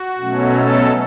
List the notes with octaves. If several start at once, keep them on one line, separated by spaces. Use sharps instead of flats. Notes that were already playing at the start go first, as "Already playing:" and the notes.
Already playing: F#4
B2 F#3 A3 C#4
A4